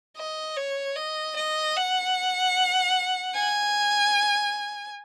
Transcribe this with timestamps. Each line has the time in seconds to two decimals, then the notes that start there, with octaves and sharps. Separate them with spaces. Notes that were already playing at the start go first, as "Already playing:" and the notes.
0.17 D#5
0.57 C#5
0.96 D#5
1.36 D#5
1.76 F#5
3.34 G#5